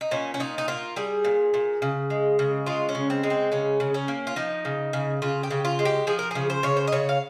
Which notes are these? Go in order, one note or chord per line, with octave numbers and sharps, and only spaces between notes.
D#4
A#2 C#4
C#4
A#2 D#4
D#4
A#3 F4
G3 G#4
A#2
A#2
C#3
G#3
C#3
G#3 F4
C#4
C#3
C4
G#3
C4
C#3 C#4
C#3
C#4
A#3
F4
F3 D#4
C#3
C#3
C#3 F4
G4
C#3
F4
G#3
G4
F3 G#4
A#4
C#3 G#4
C5
C#3 C#5
C5
D#5
C#3 C#5
F5